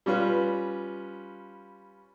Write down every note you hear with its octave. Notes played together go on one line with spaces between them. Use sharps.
G3 C#4 F4 B4